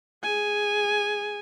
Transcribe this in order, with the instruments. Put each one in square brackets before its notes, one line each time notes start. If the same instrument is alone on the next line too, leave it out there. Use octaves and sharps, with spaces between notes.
[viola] G#4 G#5